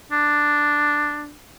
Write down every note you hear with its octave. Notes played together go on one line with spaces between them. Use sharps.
D4